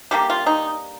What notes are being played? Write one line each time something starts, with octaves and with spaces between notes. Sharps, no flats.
D3 G3 A#3 G4
F4
D#4